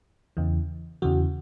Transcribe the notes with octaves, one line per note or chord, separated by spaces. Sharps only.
E2 C#3 E3
E2 C#3 E3 F#4